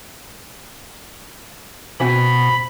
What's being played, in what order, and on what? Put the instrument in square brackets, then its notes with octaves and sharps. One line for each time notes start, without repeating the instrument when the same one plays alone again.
[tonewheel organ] B2 [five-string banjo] C4 F#4 G#5 [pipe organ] B5